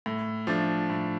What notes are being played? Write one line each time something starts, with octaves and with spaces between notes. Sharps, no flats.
A2
F3 A3 D4
A2